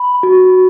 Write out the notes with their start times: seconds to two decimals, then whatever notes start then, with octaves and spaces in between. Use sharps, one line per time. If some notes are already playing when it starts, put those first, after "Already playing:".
Already playing: B5
0.23 F#4